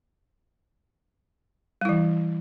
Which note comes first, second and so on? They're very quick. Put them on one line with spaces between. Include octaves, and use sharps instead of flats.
G3 E4 E3